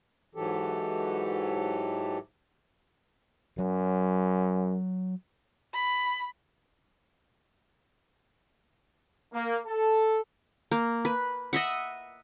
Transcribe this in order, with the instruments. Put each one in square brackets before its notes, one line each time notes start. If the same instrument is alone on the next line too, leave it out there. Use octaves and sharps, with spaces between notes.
[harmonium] G#2 E3 F#3 G4 A4
[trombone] F#2 [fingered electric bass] F#3
[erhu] B5
[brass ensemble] A#3
A4
[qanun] A#3
B4
D#5 E5 F#5